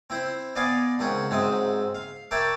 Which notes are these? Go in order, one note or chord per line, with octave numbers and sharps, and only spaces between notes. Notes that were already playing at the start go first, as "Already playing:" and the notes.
C4 E4 C5
B3 D5 D#5 F5 G#5
C#2 D#3 C4 C#4 F#5
G#2 F#3 C4 E5 D#6
F5
A#4 C#5 D5 E5 G5 A5